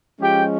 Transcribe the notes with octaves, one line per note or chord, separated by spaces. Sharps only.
F3 G#3 C#4 F4 G4 G5